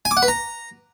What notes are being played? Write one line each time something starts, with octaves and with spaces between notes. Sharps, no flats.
G#5
D6
F#5
B4
A#5